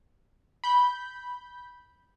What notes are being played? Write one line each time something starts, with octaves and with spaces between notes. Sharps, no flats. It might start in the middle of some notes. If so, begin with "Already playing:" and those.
B5 G6